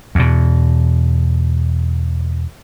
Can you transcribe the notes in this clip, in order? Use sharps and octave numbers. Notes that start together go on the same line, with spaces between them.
E2 B2